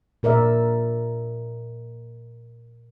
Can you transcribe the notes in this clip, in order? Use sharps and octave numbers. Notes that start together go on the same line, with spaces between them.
A#2 A#4 D5 E5